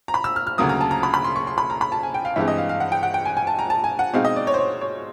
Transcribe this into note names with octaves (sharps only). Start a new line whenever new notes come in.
A#5
B5
E6
F6
F6
D2 C#3 F#3 A#3 D#6
A#5
A5
A#5
B5
B5
C6
C#6
C6
B5
A#5
B5
A5
G#5
G5
F5
G2 E3 G#3 C4 E5
D#5
F5
F5
F#5
G5
F#5
G5
G#5
G#5
A5
A#5
A5
G#5
F#5
B2 G#3 C4 D#4 F5
D#5
D5
C#5
C5
C#5
C#5